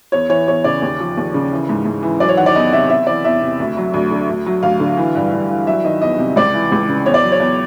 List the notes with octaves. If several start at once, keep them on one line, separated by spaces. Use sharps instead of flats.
E2 C#5
E3 C#5
E2 C#5
C#3 D5
D#2
F3
D#2
C#3
E3
G#2
G#2
E3
F#3 D5
C#5
D#3 F#5
D5
E2 D#5
C3 E5
E2 E5
E3 D5
E2 E5
C3
D2
F#3
D2
D3
D2
F#3
D2 F5
D3
E3
G2
G2
E3
F#3 E5
D#3 D#5
E2 D#5
C3
C#2 D5
E3
C#2
C#3
E2 C#5
D5
F#3
C#5
E2